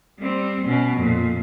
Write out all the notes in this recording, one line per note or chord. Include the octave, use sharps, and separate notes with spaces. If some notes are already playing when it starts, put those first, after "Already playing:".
G3 C4
B2 C#4
F2 A#2